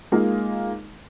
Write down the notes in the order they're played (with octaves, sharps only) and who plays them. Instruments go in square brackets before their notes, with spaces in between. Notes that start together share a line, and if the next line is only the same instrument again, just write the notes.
[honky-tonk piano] G#3 A#3 D#4 F4